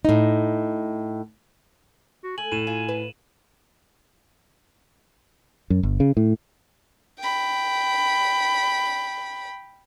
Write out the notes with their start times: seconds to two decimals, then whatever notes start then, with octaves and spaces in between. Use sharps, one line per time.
0.05 A2 D#4
2.24 F#4
2.38 A3 G#5 F#7
2.52 A2 D#7 E7
2.67 F4 G#5
2.89 B4
5.70 F#2
5.83 G1
6.00 C#3
6.17 A2
7.19 G5 B5